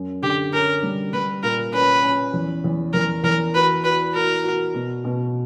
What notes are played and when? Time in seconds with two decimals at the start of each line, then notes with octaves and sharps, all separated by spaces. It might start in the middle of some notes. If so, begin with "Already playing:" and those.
Already playing: F#2
0.22 D3 G4
0.53 C#4 A#4
0.83 G3
1.13 G3 B4
1.43 A#2 A#4
1.73 C#4 B4
2.03 C#4
2.33 E2
2.64 E2
2.93 E2 A#4
3.24 E2 A#4
3.54 F#4 B4
3.84 F#4 B4
4.14 F#4 A#4
4.44 F#4
4.74 B2
5.04 B2